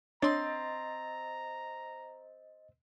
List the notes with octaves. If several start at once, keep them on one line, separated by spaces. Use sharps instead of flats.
C4 D4 C#5 D#5 A#5 C6 A6